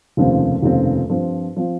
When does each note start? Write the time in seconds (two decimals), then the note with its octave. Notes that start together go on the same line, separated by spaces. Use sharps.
0.17 F1 D#2 C#3 F3 C4
0.62 F1 D#2 C#3 F3 C4
1.09 G2 F3 C4 F4
1.56 F3 C4 F4